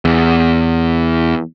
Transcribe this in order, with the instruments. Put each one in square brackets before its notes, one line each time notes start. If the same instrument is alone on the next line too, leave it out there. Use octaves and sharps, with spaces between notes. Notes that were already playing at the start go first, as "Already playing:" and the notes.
[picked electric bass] E2